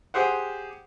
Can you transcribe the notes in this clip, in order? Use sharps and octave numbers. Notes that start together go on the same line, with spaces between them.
G4 G#4 C5 F#5